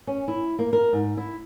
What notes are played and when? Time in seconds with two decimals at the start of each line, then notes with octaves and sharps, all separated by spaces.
0.07 C#4
0.28 E4
0.59 A#3
0.73 A#4
0.93 G#2
1.17 E4